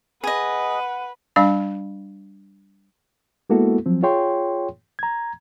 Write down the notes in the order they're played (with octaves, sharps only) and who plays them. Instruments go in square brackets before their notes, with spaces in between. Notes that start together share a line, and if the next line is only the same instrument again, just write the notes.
[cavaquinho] G#4 D#5 [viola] B4 [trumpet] F#5
[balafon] G3 D4 F5 B5
[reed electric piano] G#3 A#3 B3 E4 F#4 A4
F3 F#3 C4
F4 G#4 C#5 G5 C6
A#5 G#6